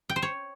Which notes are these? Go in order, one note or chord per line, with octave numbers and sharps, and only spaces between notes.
G5
C5
C#5